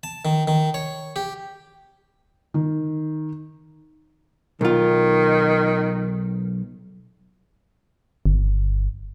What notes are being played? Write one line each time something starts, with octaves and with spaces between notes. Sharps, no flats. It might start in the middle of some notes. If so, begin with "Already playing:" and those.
A5
D#3
D#3
C#5
G4
D#3
B1 D#3 F4
G1